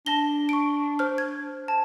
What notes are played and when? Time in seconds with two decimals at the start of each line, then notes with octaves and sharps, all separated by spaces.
0.06 D4 A5 A#6 G7
0.49 C#6 D7
0.99 C5 F6
1.18 G#6
1.68 A5